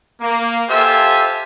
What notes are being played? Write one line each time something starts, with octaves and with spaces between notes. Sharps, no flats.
A#3
F4 G4 A4 C5 E5 G#5